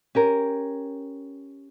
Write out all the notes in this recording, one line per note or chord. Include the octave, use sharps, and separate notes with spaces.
C#4 G4 A#4